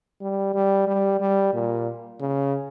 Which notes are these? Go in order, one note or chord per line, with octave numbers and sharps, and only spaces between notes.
G3
G3
G3
G3
A#2
C#3